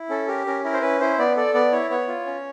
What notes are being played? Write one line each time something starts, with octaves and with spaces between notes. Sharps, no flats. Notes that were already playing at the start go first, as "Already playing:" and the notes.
Already playing: E4
C#4 A4
G4 A#4
C#4 A#4
E4 A#4
C5
C#4 B4
E4 C5
B3 D5
A4 D5
B3 D5
E4 C#5
B3 C#5
F4
C#4